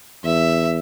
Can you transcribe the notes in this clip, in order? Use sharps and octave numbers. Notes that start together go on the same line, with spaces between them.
E2 E5